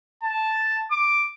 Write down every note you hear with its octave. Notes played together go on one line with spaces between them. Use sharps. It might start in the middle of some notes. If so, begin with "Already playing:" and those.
A5
D6